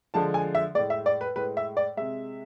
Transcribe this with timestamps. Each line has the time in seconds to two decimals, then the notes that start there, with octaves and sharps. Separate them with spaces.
0.14 D3 F3 G#3 A5
0.34 G#5
0.55 E5
0.75 G#3 D5
0.78 A2
0.90 E5
1.06 D5
1.21 B4
1.36 A2 G#3 B4
1.57 E5
1.77 D5
1.97 C3 G#3 E5